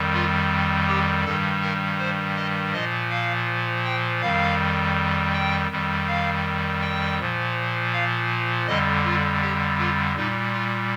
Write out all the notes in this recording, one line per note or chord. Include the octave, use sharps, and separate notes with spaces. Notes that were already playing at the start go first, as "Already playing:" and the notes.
Already playing: F2 D#3 G3
F4
G4
G2 D#3 G3 A4
A#4
C5
D#5
A#2 F3 D#5
F5
G5
F2 D#3 G3 F5
G5
F2 D#3 G3
F5
G5
A#2 F3
F5
F2 D3 G3 D#5
F4
G4
F4
A#2 G3 D#4
F4